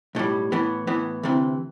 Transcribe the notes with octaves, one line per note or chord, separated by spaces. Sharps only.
B1 A2 G3
A2 E3 B3
A2 E3 B3
D2 C3 E3